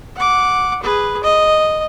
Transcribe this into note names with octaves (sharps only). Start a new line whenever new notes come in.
F#5 D6
G#4 B4
D#5